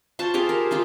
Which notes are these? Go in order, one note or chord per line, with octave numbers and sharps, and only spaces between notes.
F4 C5 A5 C#6
G4 G#4 C5 F5
A#4
G#3 D#4 F4